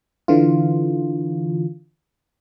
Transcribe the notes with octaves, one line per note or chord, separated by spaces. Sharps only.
D3 E3 F4